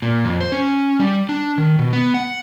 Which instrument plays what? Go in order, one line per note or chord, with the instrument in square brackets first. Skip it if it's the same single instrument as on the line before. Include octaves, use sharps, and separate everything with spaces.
[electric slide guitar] A#2
F2
C5
C#4
G3
D4
D#3
B2
B3
F#5